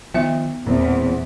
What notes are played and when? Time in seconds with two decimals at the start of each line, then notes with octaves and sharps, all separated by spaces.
0.14 D#3 F3 B3 E5
0.67 E1 E2 A#2 C4